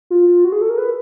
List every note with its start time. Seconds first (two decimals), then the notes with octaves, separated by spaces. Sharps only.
0.10 F4
0.45 F#4
0.52 G#4
0.61 A4
0.69 A#4
0.78 B4